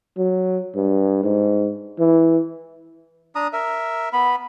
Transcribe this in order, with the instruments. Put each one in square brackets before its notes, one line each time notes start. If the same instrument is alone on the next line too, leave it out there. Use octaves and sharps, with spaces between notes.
[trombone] F#3
G2
G#2
E3
[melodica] D4 A#5 D#6
A#4 E5
B3 B5